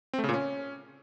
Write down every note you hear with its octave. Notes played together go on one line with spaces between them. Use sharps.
C4
A3
C#3
A#2
C#4